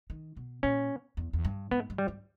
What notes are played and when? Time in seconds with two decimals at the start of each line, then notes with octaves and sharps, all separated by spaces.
0.10 D#3
0.37 B2
0.63 A#2 C#4
1.17 E2
1.33 E2
1.45 G2
1.71 G#2 B3
1.90 G2
1.98 G3
2.08 G2